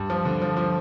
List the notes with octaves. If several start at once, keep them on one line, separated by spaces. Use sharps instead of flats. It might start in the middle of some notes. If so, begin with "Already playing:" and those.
Already playing: G2
F3
D3
F3
F3